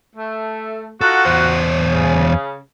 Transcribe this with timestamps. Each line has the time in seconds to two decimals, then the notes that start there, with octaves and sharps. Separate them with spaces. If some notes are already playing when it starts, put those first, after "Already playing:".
0.16 A3
1.01 D#4 F4 F#4 A4
1.25 E2 C5
1.90 C#3